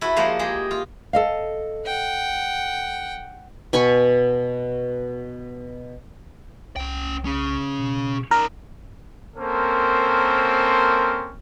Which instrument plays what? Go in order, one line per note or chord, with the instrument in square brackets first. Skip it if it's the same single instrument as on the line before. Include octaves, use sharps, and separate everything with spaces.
[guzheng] E4 F#4 A4 B4
F3 G#3 A#3 C5 F#5
G#3 G4 G#4
F4
[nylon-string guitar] A4 D#5 F5
[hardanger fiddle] F#5 G5
[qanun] B2 G#5 B5 C#6
[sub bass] C2 [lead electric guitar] C#4 G5
[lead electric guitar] C#4 G#4
[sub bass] B2
[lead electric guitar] D#4 D5 [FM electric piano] A#4
[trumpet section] A#3 C4 C#4 A4 A#4 C5